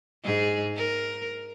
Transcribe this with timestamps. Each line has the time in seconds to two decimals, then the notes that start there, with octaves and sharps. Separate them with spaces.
0.24 G#2 G#4
0.77 A#4